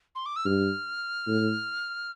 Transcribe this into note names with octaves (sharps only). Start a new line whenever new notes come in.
C6
D6
E6
G2 F6
A2